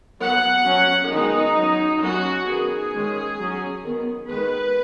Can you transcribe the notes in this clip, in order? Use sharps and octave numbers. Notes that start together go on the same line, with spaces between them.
F#3 B3 F#5
F#3 C#4
D#3 G#3 B3 D#4
F#3 C#4
F#3 C#4 F#4
D#3 B3 G#4
D#3 G#3 C#4
F#3 C#4
D#3 B3
D#3 G#3 B3 B4